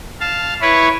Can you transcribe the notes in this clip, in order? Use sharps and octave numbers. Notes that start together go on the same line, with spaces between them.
F5 A5
E4 B4 C#5